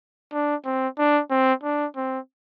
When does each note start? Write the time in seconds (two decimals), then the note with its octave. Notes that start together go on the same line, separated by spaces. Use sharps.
0.32 D4
0.65 C4
0.98 D4
1.30 C4
1.63 D4
1.96 C4